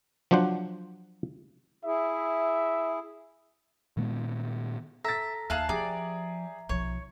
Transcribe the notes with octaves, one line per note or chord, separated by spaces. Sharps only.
F3 F#3 D4 C5 F#5
E4 G#4 E5
A#2 D#3 G#3 B3
A4 E5 A#5 A6 A#6
D#2 G#4 E5 F5 A5 F#6
F3 G4 G#4 D5 E5 A#5
B1 F3 C#5